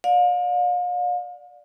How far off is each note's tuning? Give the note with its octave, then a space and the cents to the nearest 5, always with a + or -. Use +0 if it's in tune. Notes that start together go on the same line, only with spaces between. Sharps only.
D5 +5 F5 +40